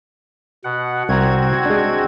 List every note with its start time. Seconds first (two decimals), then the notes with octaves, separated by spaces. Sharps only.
0.64 B2 F#5
1.09 C2 C4 F#4 F#5 A#5 G#6
1.66 G#3 D4